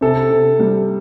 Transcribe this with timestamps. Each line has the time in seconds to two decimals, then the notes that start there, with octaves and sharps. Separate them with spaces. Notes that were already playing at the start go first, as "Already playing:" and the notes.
0.01 C3 A4
0.30 C3
0.59 G3